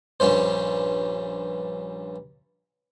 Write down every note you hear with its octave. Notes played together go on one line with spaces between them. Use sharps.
A#1 G2 C#4 C5